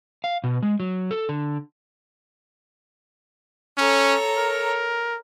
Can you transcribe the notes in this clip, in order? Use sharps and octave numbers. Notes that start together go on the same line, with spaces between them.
F5
B2
G#3
F#3
A4
D3
C#4 A4 C#5 A#5
A#4